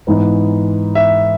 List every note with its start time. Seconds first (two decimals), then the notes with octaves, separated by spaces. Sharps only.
0.07 G#2 E3 B3 D#4
0.95 E5